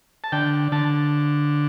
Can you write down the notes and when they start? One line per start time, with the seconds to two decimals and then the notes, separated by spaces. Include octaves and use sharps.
0.24 A5
0.32 D3 G5
0.72 D3 A5